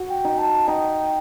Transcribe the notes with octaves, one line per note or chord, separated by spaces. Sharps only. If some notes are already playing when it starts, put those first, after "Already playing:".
Already playing: F#4
G5
D#4
A5
D#4 G5